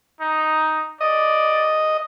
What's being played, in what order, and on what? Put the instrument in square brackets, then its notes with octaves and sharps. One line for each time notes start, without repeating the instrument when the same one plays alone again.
[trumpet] D#4
[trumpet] D5 [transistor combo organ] D#5